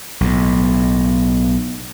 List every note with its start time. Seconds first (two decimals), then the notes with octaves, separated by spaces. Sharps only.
0.21 B1 A2